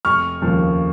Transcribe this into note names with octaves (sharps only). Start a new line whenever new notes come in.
F1 C#6 F6
D#2 C#3 F3